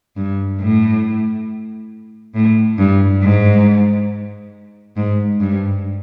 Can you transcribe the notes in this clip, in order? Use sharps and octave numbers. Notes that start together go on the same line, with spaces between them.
G2
A2
A2
G2
G#2
G#2
G2